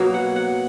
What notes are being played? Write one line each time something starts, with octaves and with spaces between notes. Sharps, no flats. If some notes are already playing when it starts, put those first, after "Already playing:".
Already playing: B2 F#3 A#3
F#5
F#5